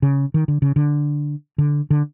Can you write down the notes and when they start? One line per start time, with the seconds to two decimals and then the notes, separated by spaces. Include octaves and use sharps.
0.02 C#3
0.34 D#3
0.48 D3
0.62 C#3
0.76 D3
1.58 D3
1.90 D3